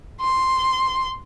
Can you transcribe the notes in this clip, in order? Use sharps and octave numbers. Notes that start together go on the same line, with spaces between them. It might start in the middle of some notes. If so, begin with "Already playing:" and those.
C6